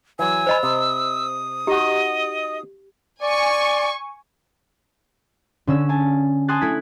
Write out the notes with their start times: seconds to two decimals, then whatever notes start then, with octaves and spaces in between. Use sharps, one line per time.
0.19 E3 F#3 G#5 E6
0.47 C5 D#5 B5
0.63 C3 D#6
1.67 D#4 F#4 G4 D#5
3.23 D5 G#5 C#6
5.67 D3 C#4 E6
5.89 G#5 A5
6.48 G#5 A5 C6 D#6 F#6 A6
6.61 A3 E4 G#6 B6